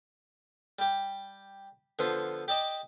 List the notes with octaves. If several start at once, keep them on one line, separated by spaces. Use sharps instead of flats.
G3 G4
D3 F3 B3 B4 C5
G4 D5 D#5 A5